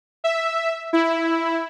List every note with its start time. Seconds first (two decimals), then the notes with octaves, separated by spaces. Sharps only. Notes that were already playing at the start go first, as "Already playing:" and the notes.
0.24 E5
0.93 E4